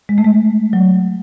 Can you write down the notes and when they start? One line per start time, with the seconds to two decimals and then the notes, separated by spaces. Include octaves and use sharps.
0.09 G#3
0.18 A3
0.24 G#3
0.73 F#3